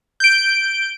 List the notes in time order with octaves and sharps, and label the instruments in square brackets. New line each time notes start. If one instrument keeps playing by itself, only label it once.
[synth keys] G6 D7